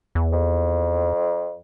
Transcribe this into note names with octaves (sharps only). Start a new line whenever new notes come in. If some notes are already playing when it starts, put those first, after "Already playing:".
E2
F2